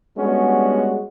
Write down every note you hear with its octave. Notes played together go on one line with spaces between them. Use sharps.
G3 G#3 B3 C#4 D4 F#4